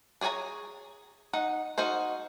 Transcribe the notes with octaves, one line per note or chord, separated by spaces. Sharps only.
D4 G#4 C#5 G#5 A#5
D#4 F#5
D#4 F#4 A#4 C5